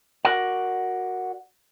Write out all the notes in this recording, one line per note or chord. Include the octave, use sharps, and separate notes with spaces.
F#4 A#4 D5 F#5